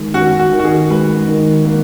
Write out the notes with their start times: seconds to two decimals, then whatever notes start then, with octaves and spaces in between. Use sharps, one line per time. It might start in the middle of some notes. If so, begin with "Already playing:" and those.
Already playing: D#3 G#3
0.14 C#4 F#4
0.39 F#4
0.52 D#3
0.59 F#4
0.65 G#4
0.90 G#3 B4
1.28 D#3
1.65 A#3